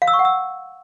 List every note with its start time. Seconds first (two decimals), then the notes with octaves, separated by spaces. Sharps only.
0.02 F5
0.07 E6
0.13 C#6
0.19 F#5
0.25 E6